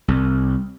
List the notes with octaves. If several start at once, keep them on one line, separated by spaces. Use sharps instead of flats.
C2